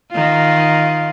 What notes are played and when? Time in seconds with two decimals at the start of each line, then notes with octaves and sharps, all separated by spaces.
0.12 D#3 F4